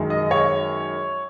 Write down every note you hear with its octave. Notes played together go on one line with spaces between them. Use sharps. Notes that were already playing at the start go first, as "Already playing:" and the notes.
Already playing: F#2 D#3 G#3
D#5
C#5